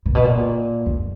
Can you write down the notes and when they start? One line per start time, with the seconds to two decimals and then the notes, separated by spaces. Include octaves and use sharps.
0.06 A#2
0.15 B2
0.24 A#2
0.86 F2